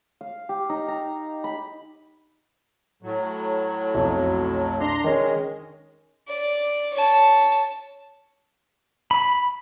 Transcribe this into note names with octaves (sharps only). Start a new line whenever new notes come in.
F5
G4
D#4
A#5
B5
A2 F#3
B1 F2
D4 A#5 C6
D#3 G#3 C#4
D5
C#5 A5
B5